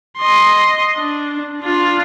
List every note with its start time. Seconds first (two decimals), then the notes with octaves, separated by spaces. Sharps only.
0.18 D#5 C6
0.97 D4
1.61 D4 F4